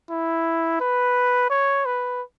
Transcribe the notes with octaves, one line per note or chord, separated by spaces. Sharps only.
E4
B4
C#5
B4